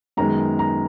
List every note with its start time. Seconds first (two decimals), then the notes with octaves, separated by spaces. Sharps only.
0.17 F#2 D#3 G#3 B3 A#5
0.59 A#5